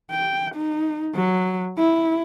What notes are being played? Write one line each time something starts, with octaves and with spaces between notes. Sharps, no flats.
G5
D#4
F#3
E4